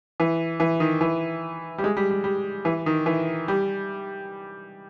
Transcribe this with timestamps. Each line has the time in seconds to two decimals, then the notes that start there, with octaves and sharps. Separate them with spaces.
0.20 E3
0.60 E3
0.80 D#3
1.01 E3
1.78 G3
1.84 G#3
1.97 G3
2.10 G3
2.24 G3
2.65 E3
2.86 D#3
3.06 E3
3.48 G3